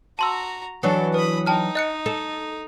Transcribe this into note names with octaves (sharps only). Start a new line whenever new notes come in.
F#4 A5 A#5 C6 E6
E3 F#3 D4 A4
B4 B5 D#6
D#4 G5 A5 F6
D#5 F#6 C#7
A4